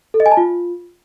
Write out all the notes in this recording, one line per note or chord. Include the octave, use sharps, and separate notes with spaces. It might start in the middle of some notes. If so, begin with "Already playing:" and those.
A4
D#5
G#5
A5
F4